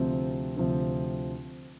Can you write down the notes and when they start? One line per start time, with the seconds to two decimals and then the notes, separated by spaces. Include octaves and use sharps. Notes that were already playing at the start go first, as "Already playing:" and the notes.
Already playing: D2 C3 F3 C4
0.57 D2 C3 F3 C4